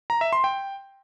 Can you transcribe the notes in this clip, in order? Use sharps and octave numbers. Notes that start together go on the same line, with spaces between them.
A#5
E5
C6
G5